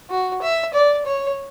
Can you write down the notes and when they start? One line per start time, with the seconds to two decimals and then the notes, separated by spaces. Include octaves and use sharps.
0.10 F#4
0.42 E5
0.74 D5
1.06 C#5